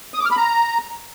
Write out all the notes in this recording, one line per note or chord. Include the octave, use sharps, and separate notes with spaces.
D#6
D6
F6
B5
A#5